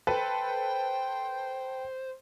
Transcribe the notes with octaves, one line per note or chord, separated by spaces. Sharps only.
A4 B4 C5 G5